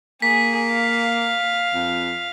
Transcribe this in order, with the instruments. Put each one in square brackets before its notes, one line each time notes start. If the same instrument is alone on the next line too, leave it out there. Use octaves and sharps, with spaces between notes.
[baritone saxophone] A#3 [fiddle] G#4 [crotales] B6
[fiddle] F5
[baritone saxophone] F2